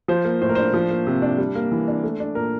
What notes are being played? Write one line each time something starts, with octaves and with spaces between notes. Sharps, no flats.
F3 C5
A#3
A2 C5
A#4
D4 C5
F3
A#3
C3
D4
G3
A#3
E3
D4
A3
D4
A#2 A#4